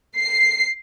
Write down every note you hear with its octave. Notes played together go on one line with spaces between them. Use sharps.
C7